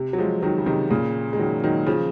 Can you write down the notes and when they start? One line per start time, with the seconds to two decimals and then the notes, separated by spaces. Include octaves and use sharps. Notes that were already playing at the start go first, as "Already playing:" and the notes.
Already playing: C3
0.13 F#3
0.18 F3 G#3
0.42 D#3 F#3
0.58 C#3
0.66 C3 D#3
0.90 A#2 C#3
1.33 G#3
1.39 D#3 F#3
1.64 D#3 F#3
1.87 C#3 F3